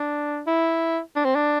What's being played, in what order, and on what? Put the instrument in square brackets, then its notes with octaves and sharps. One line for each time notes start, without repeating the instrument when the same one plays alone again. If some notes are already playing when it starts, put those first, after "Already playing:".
Already playing: [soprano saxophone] D4
E4
D4
C4
D4